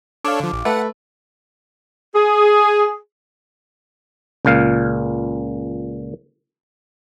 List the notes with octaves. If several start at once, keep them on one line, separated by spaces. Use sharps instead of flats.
D4 A4 C#5 F5 D6
D3 F3
A#1
A3 B4 F#5
G#4
C#2 A#2 F5